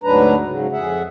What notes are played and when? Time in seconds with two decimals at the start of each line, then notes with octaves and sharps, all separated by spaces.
0.04 D2 G#2 F#3 D4 B4 A#5
0.48 G#2 C#3 F#3
0.72 F2 G#4 E5 F#5